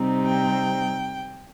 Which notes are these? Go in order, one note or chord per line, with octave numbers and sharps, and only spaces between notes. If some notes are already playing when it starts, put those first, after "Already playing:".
Already playing: C3 G3 C4 D#4
G5